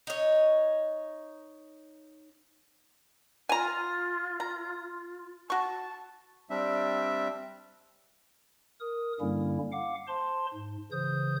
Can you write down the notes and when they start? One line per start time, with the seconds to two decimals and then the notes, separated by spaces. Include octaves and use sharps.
0.07 D#4 C#5
3.49 F4 G#5 A#5
4.40 A#5
5.50 F#4 A5 C#6
6.50 G3 C4 D4 E5
8.80 A#4 D#6
9.20 G2 D3 G3 A#3 C#4 E4
9.72 F5 F#5 D6
10.07 C5 A5 C6
10.54 G#2
10.92 C#3 E3 C5 D#6 G6